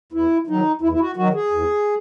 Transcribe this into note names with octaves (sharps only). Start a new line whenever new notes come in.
E2 E4
D#3 F#3 D#4
E2 E4
E4
F#4
D#3 F#3 F#4
G#4
E2